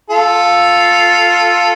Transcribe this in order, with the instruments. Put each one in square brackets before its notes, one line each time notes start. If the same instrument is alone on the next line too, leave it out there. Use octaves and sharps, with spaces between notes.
[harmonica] F4 A4